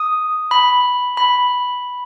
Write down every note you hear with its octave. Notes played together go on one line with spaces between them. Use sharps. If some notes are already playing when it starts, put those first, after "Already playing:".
Already playing: D#6
B5
B5